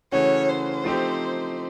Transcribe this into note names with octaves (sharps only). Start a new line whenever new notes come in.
C#3 E3 A3 C#4 F#4 C#5
C5
F3 A3 C4 D#4 G4